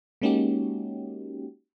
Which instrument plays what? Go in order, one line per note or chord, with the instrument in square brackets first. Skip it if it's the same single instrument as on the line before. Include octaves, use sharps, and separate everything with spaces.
[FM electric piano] G#3 A#3 C#4 D#4 F#4 G4